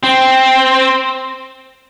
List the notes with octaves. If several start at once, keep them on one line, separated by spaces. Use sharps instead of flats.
C4